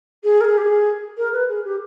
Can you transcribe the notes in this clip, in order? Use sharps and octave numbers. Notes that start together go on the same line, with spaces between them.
G#4
A#4
G#4
G4
G#4
A#4
B4
G#4
G4